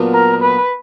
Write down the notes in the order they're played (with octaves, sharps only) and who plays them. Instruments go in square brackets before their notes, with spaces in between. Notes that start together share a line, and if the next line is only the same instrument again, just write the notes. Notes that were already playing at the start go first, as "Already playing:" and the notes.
Already playing: [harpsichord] A#2 F#3 B3 D4 F4
[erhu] A#4
B4